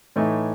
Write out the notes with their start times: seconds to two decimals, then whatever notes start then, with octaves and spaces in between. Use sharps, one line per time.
0.16 A2 E3 A3 D#4